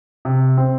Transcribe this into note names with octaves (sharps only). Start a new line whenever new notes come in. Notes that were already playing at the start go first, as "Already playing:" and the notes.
C3
C4